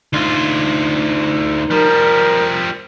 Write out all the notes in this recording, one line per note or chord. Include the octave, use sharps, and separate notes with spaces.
D2 D#4 F4 C6
F3 G3 A#4